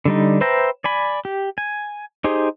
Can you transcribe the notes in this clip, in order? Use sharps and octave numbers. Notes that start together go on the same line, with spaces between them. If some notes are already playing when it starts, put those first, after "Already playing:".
D3 G3 D#4
B4 C5 E5 G5 A#5
D5 G#5 B5
G4
G#5
D#4 G4 G#4 C5